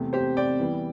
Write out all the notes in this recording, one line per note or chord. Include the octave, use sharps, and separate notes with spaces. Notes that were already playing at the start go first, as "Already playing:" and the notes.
Already playing: E2 C3 A3
G4 C5
D5 G5
E2 E3 G3